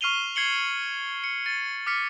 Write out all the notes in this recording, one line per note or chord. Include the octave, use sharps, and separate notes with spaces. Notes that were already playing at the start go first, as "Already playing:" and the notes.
C#6 F6 C7 D#7 F7 G7
G#6 C7 C#7 F#7 G7
C#7
A6 C#7 D#7
D6 F6 B6 C#7